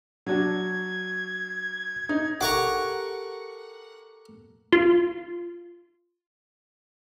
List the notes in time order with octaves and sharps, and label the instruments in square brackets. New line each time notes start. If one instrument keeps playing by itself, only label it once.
[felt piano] F#3 D4 F#4 [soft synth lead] G#6
[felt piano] D#4
[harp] G4 A4 A#4 [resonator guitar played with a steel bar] F#5 [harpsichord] A#5 C#6 D6
[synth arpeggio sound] F4 C6